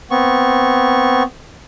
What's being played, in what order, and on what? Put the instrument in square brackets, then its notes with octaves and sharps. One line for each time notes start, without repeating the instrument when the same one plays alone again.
[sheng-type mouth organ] B3 C4 C#6